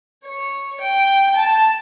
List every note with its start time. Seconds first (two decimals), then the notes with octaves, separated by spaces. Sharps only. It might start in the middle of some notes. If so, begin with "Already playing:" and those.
0.25 C#5
0.80 G5
1.35 A5